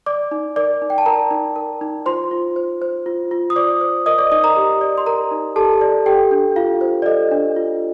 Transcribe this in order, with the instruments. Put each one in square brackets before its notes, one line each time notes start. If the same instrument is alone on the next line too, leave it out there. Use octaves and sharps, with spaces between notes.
[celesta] D5 D6
D#4
A#4 D5 D6
D#4
G5
A5
A#4 D5 A#5
D#4
A#4
D#4
F4 C5 C6
F4
C5
C5
F4
F4
D#6
C5 D5 D6
C5
A#4 D#5 D#6
D5 D6
D#4 D#5 D#6
A#4 A#5
G4
D5
C6
A#4 A#5
D#4
G4 A4 A5
D5
G4 A4 G5
D4
F4 F5
C5
D5
A4 D#5
D4
F4